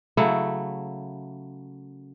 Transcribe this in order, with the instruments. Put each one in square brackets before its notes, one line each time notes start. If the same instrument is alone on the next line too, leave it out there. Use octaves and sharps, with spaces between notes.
[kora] C#3 F#3 A3 E4